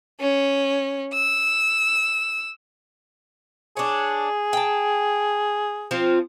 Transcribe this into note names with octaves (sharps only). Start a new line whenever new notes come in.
C#4
E6
D4 G#4 C#5
G5 A5
F3 C4 F4